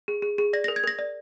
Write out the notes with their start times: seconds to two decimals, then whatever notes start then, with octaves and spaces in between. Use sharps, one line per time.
0.08 G#4
0.22 G#4
0.38 G#4
0.53 D5 A#6
0.64 A#4 A#6
0.76 G#6
0.84 A#4 A#6
0.99 D5